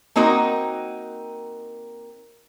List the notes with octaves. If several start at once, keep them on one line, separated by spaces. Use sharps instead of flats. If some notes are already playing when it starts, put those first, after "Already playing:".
A#3 C4 D#4 F#4 A#4